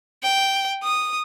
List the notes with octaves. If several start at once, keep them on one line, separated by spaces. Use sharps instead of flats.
G5
D#6